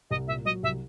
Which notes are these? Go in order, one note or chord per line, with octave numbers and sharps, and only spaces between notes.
C2 D#5
A#2 E5
F#3 D#5
C2 E5